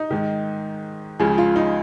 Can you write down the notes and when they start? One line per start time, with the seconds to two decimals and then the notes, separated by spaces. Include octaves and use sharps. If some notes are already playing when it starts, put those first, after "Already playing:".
Already playing: D#4
0.11 G#2 D#3
1.19 C#2 C#3 F3 G#4
1.38 F4
1.56 D#4